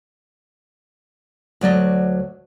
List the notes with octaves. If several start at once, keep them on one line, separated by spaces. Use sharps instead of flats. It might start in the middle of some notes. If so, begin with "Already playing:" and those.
D2 F#3 D5 D#5